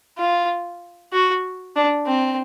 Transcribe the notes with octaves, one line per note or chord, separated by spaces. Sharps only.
F4
F#4
D4
C4